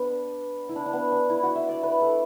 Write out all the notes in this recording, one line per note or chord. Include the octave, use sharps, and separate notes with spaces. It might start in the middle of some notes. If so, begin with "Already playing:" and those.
Already playing: B3 D4
E4
D4
D4
B3
D4
E4
F#4
E5
D5
B4
A4